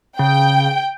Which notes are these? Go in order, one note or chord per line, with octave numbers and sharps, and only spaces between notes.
C#3 G5